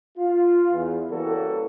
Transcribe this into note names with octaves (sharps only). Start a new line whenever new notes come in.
F4
E2
C#3 E3 G3 A#3 F#4 A4